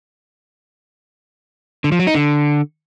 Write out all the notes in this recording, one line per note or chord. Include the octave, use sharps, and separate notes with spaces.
D3
F3
F#3
D#4
D3